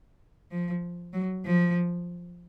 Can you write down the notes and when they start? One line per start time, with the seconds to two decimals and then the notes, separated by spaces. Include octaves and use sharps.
0.52 F3
1.14 F#3
1.45 F3